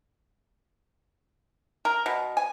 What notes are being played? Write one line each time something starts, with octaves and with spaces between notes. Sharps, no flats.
A#4
B2
G#5